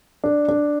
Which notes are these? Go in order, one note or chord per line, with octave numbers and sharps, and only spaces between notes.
D4
D4